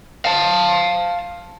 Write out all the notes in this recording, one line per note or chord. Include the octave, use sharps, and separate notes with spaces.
F5 A5